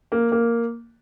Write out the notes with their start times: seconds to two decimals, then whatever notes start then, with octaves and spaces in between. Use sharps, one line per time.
0.12 A#3
0.32 A#3